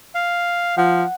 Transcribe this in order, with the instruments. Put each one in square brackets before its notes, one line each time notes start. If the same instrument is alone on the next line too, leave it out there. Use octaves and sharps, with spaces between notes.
[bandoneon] F5
[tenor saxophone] F3 [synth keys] F#5